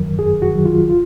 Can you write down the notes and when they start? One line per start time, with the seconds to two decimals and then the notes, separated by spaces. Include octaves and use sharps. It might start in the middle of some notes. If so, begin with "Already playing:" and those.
Already playing: F#2 D#3 F#3 A#4
0.18 F#2 G#4
0.42 F#4
0.54 D#3 F#3
0.65 F4
0.89 F4